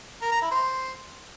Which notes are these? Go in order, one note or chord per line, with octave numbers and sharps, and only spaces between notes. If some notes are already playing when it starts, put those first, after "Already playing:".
A#4
A#5
E4
C5